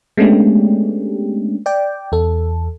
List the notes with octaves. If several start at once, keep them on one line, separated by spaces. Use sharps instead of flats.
G#3 A3 B3 C#4 D4 G4
D5 G5
E2 A4